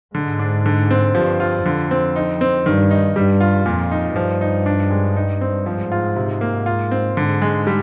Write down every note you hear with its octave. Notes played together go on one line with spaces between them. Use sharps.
G#2 D3
D4
D3
C4
G2 F3
F4
F2 D3
C4
D#4
C4
G2 D#3
D#4
G2 G3
F4
F2 A#2
D#4
G2 F3
D#4
D4
G#3
D#4
C4
G#2 F3
F4
C3
A#3
F4
C4
G#2 D3
G#3
G3